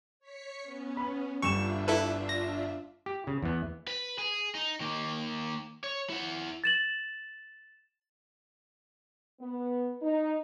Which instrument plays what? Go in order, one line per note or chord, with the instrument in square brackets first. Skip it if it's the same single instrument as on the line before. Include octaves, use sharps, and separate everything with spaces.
[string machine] C#5 B6 C#7
B3 C#4
[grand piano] B5
[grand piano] G1 G3 E7 [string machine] D4 F4 E5 [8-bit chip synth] C#6
[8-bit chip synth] E4 A4 B4
A#6
[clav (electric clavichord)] G4
C#3
E2 B3
[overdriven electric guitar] B4
G#4
D#4
D#3 A#3
C#5
E4 F#5
[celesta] A6 E7 F#7
[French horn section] B3
D#4